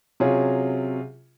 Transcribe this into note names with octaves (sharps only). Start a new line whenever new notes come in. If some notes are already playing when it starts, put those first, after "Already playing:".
C3 F#3 C#4 F4 G#4